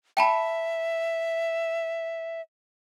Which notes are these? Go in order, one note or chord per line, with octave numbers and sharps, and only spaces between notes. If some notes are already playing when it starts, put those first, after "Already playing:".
E5 G5 A5 B5